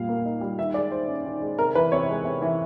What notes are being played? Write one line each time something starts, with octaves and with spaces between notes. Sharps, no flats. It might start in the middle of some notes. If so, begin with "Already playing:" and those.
Already playing: A#2 G3 F5
A#3
D#4
G3
D#3 E5
G#3 D5
D#3 C5
C#4
D#3
G#3
C3 A#4
E3 B4
C3 C#5
G#3
C3
E3